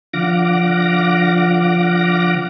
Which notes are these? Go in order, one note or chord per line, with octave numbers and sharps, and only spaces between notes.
D3 F3 F5 F#5 D6 A#6